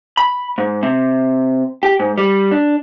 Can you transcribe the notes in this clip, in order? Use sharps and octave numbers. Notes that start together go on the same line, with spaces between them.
B5
G#2
C3
G4
G#2
G3
D4